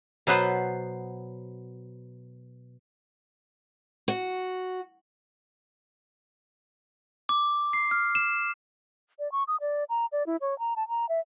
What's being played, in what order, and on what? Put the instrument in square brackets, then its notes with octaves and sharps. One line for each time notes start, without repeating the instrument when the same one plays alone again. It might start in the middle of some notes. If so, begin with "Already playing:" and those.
[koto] B2 F#3 B3 B4 C5
[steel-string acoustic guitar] F#4
[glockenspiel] D6
C7
F6
E7
[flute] D5
C#6
D#6
D5
A#5
D5
E4
C#5
A#5
A5
A#5
E5